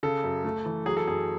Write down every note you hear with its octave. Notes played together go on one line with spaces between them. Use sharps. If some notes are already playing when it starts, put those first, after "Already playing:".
C#3 A4
F#2
A3
E3
F#3 G#4
A4
F#2 G#4